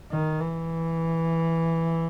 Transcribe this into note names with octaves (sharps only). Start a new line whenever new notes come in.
D#3
E3